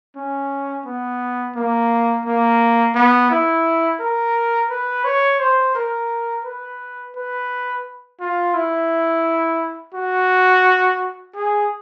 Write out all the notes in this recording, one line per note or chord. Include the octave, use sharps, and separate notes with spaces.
C#4
B3
A#3
A#3
B3
E4
A#4
B4
C#5
C5
A#4
B4
B4
F4
E4
F#4
G#4